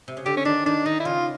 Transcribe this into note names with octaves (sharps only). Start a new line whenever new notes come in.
C3
C#3
D3 G4
C#4
D#3 D4
D#3 D4
D#3 D#4
E4
C#3 F4